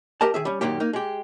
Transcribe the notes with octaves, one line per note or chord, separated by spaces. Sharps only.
G4 A#4 D#5 A5
D#3 G#4 E5
G3 C#4
F#2 A#2 D#3 A#3 G4
A#3 D#4
G#3 G4